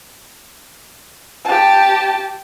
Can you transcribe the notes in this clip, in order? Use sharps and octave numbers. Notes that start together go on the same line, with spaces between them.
G4 A5